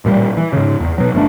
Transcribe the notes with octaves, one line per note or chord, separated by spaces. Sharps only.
A1 A#2 D#3 G3
E3
G#2 C#3
E2
B2 F#3
G1 D2 A3 D4